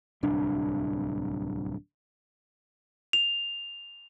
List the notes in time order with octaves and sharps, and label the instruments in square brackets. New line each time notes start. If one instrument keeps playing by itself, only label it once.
[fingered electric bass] D1 C2 D4
[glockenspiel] F7